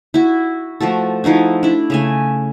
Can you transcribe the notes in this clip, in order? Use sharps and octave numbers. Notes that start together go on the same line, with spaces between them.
E4 F#4
F3 A3 F#4 A4
F3 D#4 E4 F#4
D4 E4
C#3 A3 G#5